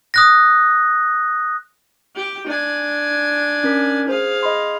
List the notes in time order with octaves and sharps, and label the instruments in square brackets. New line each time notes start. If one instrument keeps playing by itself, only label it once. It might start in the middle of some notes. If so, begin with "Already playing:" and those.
[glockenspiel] D#6 F#6 A#6
[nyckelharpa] G4 G5
D4 G#5
[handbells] C#4 A#4 B6
[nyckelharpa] G#4 F5 [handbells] C5
[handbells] D#5 B5 C6